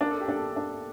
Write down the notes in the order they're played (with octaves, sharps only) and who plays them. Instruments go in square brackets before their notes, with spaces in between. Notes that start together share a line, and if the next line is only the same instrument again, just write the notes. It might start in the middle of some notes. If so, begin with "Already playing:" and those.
[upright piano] D4 [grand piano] A#4
[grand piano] A4
G4
[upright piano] D4 [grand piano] A4
[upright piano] D4